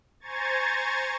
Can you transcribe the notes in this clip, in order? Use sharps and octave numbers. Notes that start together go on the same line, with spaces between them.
C5 G#5 A#5 C#6 G#6 A6